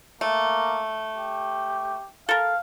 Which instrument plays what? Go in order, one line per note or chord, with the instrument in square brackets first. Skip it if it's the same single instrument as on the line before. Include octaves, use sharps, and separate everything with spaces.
[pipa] A3 [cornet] A#3
[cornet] G4
[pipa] A4 A#4 [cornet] F5